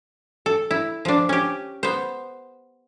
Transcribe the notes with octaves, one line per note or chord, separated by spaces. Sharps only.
A4
E4
F3 D4
C#4 G4
B3 C5